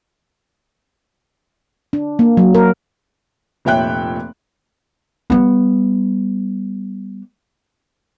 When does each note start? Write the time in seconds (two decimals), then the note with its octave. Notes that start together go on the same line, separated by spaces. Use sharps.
1.93 D4
2.19 A#3
2.37 F#3
2.55 A#4
3.65 F1 A#2 C#5 E5 G5 F#6
5.30 G3 B3